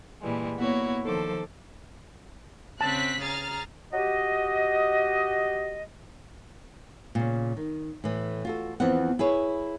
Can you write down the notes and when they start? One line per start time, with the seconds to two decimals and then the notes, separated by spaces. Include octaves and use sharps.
0.21 A#2 E3 G3 G#3
0.58 A#3 B3 E4 F#4 C#5
1.03 D#3 F3 A4 C5 D6
2.81 C#3 C4 A5 F#6 B6
3.22 G#4 A#5 F6 A6
3.92 F#4 G4 D#5
7.15 A#2 C#3
7.57 D#3
8.04 A2 E3
8.45 F4 F#4 A4
8.80 E2 E3 F3 B3 C4 F#5
9.19 E4 G#4 B4 C#5